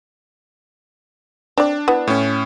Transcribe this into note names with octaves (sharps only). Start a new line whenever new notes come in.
C4 D4 D5
B3 E4
A2 C#4